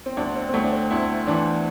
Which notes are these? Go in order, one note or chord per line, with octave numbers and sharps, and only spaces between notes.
C4
D2 D4
C4
C4
D2 A3
D4
C4
D2 E4
E3 D4